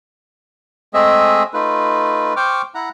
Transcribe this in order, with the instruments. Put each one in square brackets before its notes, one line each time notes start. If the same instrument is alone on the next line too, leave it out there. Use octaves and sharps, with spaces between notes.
[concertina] G#3 A3 C4 G#4 D#5 E5
A3 D#4 F4 B4
C5 G5 C#6 D6 F6
E4 F#5 A#5